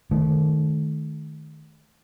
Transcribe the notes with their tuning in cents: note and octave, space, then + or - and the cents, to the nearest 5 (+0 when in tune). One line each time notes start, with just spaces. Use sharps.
D#3 -15 A3 -30